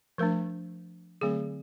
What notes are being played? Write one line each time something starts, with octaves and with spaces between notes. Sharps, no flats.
F3 A3 D4 A#4
D3 F#3 A3 C4 G#4